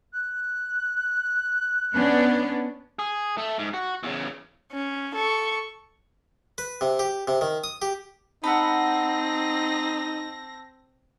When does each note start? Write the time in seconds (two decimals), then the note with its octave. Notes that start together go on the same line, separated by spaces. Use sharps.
0.13 F#6
1.93 B3 C#4 D4
2.99 G#4
3.38 A3
3.59 G#2
3.74 F#4
4.03 E2 C#3
4.72 C#4
5.15 A4 C#6
6.58 B4
6.81 C3
6.99 G4
7.28 C3
7.41 D#3
7.64 D#6
7.82 G4
8.44 C4 D#4 F#5 A5 B5 E6 A#6